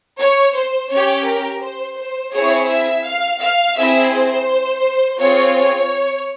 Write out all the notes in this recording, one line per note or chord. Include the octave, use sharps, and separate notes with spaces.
C#5
C5
C#4 G4 C#5
A#4
C5
C5
C4 E4 G#4 C#5
E5
F5
F5
C4 E4 G#4 E5
C5
C4 F4 G#4 C#5
C#5